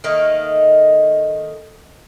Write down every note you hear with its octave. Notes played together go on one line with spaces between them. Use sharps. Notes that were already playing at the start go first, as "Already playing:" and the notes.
D#3 A3 A#3 D#4